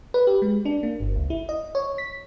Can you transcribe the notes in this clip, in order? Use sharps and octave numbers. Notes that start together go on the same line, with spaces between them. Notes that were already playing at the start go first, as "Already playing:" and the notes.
B4
G4
G#3
D4
A#3
G1
C#2
E4
D#5
C#5
B6